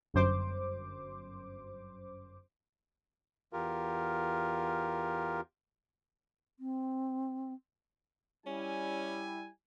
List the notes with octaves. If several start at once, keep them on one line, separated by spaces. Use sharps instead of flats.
G1 F#2 C5 D6
E2 F4 G4 A#4
C4
G3 C#4 E4 G#5